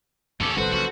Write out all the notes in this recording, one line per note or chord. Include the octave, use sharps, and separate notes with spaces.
D#2 A2 C#4 A4 D6
G1 C2 A2 F#4 A4 B4 C5
A#1 C#3 F#3 F#4